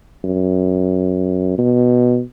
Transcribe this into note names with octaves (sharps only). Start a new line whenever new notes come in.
F#2
B2